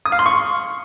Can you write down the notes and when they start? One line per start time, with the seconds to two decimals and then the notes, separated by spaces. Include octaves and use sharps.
0.05 D#6
0.12 F5
0.19 C6
0.26 C#6